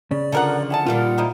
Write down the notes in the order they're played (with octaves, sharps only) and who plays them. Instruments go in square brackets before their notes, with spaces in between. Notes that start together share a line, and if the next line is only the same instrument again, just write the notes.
[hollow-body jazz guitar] C#3 [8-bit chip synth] D5
[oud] D3 F3 [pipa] A4 A#4 F#5
[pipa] E4 G#4 A5 [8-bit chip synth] F#5
[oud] A#2 D#3 G3 [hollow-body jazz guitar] F4
[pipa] F3 D#4 E4